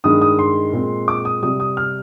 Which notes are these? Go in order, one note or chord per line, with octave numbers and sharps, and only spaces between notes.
G2 D#3 G#3 D#6
D#6
C6
A#2 G#3 C4
D6
D#6
C3 G3 C4 D#6
D#6
F6